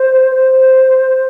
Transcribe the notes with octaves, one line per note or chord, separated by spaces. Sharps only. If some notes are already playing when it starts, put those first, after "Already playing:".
Already playing: C5
C5